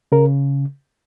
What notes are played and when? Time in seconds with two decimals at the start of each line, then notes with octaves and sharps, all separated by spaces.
0.12 C#3 A#4